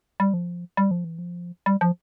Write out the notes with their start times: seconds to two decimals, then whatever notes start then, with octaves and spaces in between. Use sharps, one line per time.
0.20 G3
0.34 F3
0.77 G3
0.91 F3
1.04 E3
1.19 F3
1.66 G3
1.81 F3